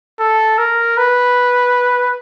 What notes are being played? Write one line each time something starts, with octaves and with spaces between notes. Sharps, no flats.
A4
A#4
B4